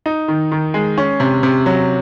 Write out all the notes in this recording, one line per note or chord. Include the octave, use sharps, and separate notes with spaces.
D#4
D#3
D#3
G#3
C#4
C3
C3
F#3